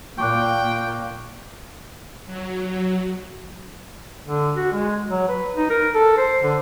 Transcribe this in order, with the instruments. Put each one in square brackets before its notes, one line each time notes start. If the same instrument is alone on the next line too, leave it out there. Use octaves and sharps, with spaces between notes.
[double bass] A#2 A#3 [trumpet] G5 [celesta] C#6 D6 F#6
[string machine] F#3
[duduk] D3
F#4
G#3
F#3
B4
D#4
A#4
A4
C5
D3